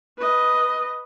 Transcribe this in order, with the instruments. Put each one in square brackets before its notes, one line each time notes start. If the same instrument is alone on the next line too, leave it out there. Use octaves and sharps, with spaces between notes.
[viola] B4 D#5